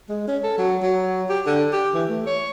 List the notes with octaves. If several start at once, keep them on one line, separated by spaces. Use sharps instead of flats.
G#3
C#4
A4
F#3
F#3
G4
D3
G4
E3
A3
C#5